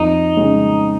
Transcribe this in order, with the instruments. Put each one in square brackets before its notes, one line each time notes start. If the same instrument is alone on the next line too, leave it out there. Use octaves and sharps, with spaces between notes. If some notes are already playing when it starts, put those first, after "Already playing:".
Already playing: [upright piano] F2 [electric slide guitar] D#4
[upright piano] C#3 G#3 C#4